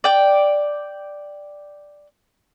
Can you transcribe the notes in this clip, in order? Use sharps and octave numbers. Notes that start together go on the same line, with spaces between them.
D5 G5